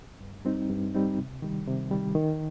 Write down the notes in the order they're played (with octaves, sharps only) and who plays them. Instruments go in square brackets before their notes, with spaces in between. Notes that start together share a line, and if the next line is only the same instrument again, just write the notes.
[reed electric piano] G2
G3 C4 D#4
G2
G3 C4 D#4
C3
D#3 G3
C3
D#3 G3
D#3